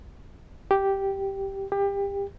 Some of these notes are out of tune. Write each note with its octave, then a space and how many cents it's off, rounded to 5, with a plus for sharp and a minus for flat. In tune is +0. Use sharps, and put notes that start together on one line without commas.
G4 -5
G4 +25